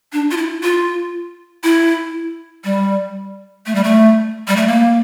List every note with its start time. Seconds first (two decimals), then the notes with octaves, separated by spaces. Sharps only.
0.13 D4
0.31 F4
0.37 E4
0.63 F4
1.64 E4
2.64 G3
3.66 A3
3.75 G3
3.84 A3
4.48 G3
4.56 A3
4.67 A#3